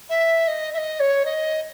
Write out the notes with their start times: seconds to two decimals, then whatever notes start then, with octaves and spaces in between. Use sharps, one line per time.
0.10 E5
0.48 D#5
0.74 E5
0.78 D#5
1.00 C#5
1.25 D#5